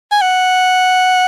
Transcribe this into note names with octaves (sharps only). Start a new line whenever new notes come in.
G#5
F#5